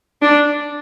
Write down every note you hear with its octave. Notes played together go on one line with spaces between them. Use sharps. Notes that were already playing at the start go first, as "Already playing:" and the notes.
D4